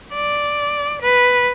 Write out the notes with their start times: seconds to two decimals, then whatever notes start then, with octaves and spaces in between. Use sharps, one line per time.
0.13 D5
1.01 B4